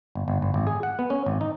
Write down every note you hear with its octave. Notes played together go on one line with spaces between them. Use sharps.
G1
G1
G1
G#1
G#4
F#5
B3
C#4
G#1
D#4